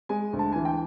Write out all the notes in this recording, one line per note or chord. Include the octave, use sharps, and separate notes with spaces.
G#3 G#5
D2
A5
E3 G#5
G5